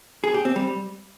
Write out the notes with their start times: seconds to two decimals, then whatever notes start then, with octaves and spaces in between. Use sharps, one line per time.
0.24 G#4
0.34 G4
0.45 C4
0.56 G3